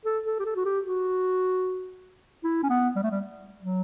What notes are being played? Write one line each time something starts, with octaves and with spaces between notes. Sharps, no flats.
A4
A4
G4
A4
F#4
G4
F#4
E4
C#4
B3
G3
A3
G3
F#3